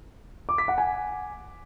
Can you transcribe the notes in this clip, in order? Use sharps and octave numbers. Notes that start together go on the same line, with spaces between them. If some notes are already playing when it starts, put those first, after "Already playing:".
D6
B6
F#5
G#5